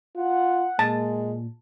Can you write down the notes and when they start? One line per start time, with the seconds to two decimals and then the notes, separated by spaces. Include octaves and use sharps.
0.16 F4 F#5
0.79 A#2 G#3 A5